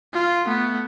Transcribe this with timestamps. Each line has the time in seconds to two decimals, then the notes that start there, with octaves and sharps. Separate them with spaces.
0.14 F4
0.46 A3 B3